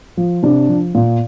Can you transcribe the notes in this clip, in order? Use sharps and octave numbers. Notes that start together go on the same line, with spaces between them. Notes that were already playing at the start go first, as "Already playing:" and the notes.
F3
C3 D4
F3
A#2